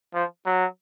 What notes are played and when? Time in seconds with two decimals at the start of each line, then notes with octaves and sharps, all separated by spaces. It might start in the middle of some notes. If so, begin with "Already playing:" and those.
0.14 F3
0.46 F#3